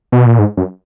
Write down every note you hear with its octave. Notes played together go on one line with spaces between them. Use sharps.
B2
A#2
G#2
F#2